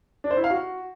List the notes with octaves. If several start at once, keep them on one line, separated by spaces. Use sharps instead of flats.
D4
C5
E4
F5
F#4